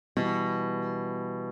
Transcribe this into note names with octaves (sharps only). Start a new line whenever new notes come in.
B2 E3 G3